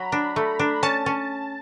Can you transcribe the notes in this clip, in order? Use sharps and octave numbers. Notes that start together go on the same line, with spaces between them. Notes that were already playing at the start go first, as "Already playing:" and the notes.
Already playing: F#3 A#5 B5
D4
A3
D4
C#4 A5
C#4